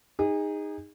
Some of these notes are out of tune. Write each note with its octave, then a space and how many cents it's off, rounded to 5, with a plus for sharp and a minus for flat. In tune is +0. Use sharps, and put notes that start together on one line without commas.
D#4 +0 G#4 -30